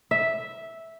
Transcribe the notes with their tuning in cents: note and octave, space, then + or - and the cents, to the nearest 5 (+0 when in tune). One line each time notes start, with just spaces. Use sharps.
E5 -5